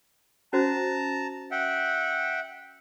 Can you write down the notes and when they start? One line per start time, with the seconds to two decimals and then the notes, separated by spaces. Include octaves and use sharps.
0.53 C#4 F#4 C5 A5 A#5
1.51 E5 F#5 G5